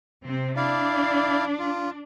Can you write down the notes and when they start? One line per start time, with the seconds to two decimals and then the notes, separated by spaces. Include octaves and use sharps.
0.23 C3 C4
0.57 D4 E4 D5 F5
1.59 F4